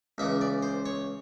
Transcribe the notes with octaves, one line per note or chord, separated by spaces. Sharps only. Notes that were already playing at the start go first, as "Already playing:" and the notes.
C#2 C#3 E3 E5
D5
C5
C#5